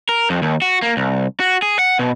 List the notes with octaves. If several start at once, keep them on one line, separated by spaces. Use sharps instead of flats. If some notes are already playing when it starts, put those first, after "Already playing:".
A#4
F2
D#2
F#4
A#3
C2
F#4
G#4
F#5
B2